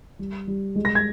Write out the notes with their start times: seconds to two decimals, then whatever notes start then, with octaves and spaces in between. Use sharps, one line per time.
0.19 G3
0.47 G3
0.76 G#3
0.85 A#6
0.95 G#6